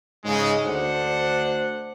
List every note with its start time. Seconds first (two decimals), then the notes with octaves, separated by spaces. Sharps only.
0.25 G#2 C#3 G#3
0.66 D2 D4 C5 F#5